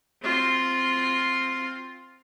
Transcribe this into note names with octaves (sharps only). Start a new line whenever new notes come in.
C4 F4